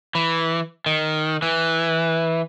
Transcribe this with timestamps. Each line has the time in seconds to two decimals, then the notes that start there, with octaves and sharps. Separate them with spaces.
0.15 E3
0.86 D#3
1.42 E3